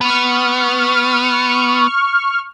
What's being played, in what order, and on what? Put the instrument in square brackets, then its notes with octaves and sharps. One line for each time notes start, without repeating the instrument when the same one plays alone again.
[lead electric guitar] B3 [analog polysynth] C#6 F6